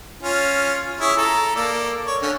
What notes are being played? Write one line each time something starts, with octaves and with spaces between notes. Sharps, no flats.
C#4 F4
E4 G#4 C#5
A4 A#5
A#3 A4 D5
C#5
D3 C#4